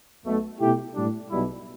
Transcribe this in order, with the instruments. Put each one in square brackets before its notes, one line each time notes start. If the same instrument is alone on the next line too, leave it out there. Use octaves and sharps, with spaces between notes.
[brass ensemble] B1 B2 A3
B2 A3 E4 G4
A2 G3 D4
B1 B2 G3 E4